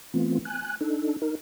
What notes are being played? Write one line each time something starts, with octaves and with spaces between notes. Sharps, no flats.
E3 A3 B3 C4 F4
G#5 F#6
D4 D#4 A4
D#4 A#4